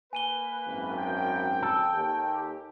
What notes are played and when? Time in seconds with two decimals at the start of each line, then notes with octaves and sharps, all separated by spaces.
0.13 A#3 B4 G#5 D#7 G7
0.67 G#1 F#2
0.97 G5
1.62 A4
1.93 D#2
2.33 G4